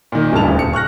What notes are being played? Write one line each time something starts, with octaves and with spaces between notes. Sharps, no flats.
A#2 D#3
D1 G2 C#3 E4 A5 F7
D#1
C#7
C#6 F6 F#6 A#6